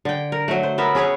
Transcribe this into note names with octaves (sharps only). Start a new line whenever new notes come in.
D3 G5
A#4
F#3 A3
C5
B3 A#4 E5
C#4 G#4 B4 C#5